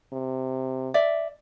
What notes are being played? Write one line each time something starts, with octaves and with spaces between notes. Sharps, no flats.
C3
D5 E5